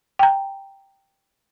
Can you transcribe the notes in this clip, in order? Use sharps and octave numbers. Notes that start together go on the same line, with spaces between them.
G5 A#5